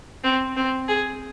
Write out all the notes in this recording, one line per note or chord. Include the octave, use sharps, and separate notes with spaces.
C4
C4
G#4